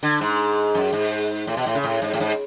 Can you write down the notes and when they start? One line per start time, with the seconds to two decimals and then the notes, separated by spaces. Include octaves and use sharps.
0.03 D3
0.21 G#2
0.74 F#2
0.93 G#2
1.47 A2
1.57 B2
1.66 A2
1.75 C#3
1.84 A2
2.02 G#2
2.13 A2
2.20 G#2